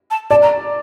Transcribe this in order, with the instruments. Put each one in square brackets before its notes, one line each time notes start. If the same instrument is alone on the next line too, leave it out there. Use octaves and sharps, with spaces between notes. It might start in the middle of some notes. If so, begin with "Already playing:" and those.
[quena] A5
[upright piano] D5 [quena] A5
[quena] A#5